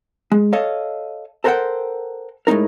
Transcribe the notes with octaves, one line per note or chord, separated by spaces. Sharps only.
G#3
A4 C#5 D#5 F5
A4 A#4 C5 C#5 F#5 G5
A2 G#3 C4 D#4 A#4